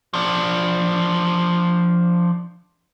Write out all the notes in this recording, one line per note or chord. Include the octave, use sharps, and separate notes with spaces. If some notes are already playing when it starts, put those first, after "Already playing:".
F3 D4